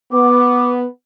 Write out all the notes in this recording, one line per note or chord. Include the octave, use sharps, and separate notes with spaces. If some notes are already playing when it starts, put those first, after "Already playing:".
B3 D6